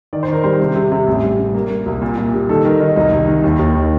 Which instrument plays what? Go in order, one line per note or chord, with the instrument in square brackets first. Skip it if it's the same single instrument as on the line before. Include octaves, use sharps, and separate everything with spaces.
[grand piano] D#3 D5
C5
D#3 A#4
G3 C5
C3
C3
C3
A1
G3
G3
A#3
A#3
C2
A#2
A#2
G3
D#3 A4
D#3 A#4
D#3 D#4
C2 D#4
C2
D#3
D#2
D#2
D#3